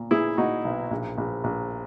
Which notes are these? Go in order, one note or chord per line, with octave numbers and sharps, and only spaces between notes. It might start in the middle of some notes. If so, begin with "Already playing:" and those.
Already playing: A#2
A#2 E4 G#4
A#2 D#4 F#4
B1
A#1
A#1
A#1